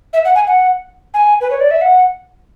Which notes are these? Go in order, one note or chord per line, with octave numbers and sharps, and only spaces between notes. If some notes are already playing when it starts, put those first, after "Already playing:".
E5
F#5
G#5
F#5
G#5
B4
C#5
D5
E5
F#5